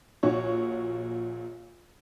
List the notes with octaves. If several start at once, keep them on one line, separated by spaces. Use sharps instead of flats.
A#1 A#2 F#4 C#5